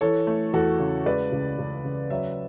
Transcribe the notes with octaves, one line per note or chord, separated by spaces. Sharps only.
E3 A4 C#5
A3
E2 F#4 A4
C#3
G#3 B4 D5
C#2
C#2
C#3
F#3 C#5 E5